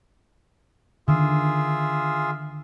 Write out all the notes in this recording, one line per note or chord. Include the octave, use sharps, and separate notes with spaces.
D3 D#3 F4 G#4 E5